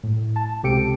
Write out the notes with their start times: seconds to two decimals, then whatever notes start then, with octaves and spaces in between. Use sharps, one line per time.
0.03 A2
0.36 A5
0.63 C#2 C3 G4 A4 C#7 D7